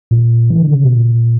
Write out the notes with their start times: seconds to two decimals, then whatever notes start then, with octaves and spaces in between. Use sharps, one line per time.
0.11 A#2
0.50 E3
0.62 D3
0.73 C#3
0.84 B2
0.96 A#2